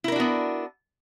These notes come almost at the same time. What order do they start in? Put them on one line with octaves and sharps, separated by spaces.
E4 A#4 D4 F#4 B3